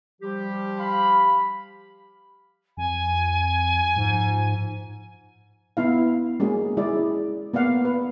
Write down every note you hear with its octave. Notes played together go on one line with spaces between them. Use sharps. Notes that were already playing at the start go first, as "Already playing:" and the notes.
F3 G3 G4
F5 B5
F2 G#5
G#2 F3
B3 E4 F5
G#3 A#3 C#4 F#4 G#4
G#3 E4 G#4 D5
A#3 B3 D5 F5 F#5
B4